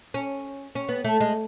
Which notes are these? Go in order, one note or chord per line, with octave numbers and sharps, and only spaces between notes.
C#4
C#4
B3
A3
G#3